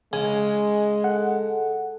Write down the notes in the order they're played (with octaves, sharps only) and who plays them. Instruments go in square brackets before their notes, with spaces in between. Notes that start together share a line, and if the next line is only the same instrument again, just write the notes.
[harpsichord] C#3 [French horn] G#3 [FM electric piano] G#5
[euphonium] A4 [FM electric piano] F#5